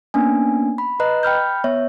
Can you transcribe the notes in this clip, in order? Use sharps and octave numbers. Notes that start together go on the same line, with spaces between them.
A#3 B3 C#4 D4 G#5
B5
B4 D#5 A#5 F#6
G5 B5 F6 G6
B3 C#5 E5